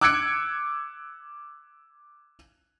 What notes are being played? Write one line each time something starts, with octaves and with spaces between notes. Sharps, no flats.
D6 E6 F#6 G#6 C#7 D7